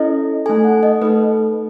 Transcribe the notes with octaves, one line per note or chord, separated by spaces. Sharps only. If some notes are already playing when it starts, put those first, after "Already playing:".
Already playing: C#4 E4 A4 D#5
A3 D#4 A4 G#5
F#5
D#5
A3 D#4 A4 B4